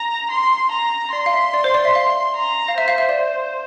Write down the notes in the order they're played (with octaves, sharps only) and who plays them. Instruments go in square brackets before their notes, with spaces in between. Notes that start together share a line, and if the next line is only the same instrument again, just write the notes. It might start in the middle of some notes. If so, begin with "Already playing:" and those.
Already playing: [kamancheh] A#5
C6
A#5
[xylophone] D5 [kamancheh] C6
[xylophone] F5
E5
D5
C5
D5
E5
F5
[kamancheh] A#5
[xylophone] F5
[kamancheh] C5 [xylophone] E5
[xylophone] F5
E5
D5